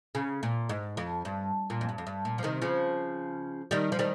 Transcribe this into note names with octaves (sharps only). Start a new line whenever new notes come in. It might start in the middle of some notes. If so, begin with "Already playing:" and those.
C#3
A#2
G#2
F2
G2
A#2
F2
G2
F2
G2
A#2
F3
C3 D#3
C#3 F3
D#3 G3
F3
D#3 G3